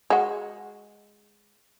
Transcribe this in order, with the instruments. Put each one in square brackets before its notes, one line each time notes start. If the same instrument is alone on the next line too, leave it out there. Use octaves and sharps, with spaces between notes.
[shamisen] G#3 F#4